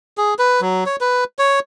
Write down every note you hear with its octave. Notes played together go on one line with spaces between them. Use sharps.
G#4
B4
F#3
C#5
B4
C#5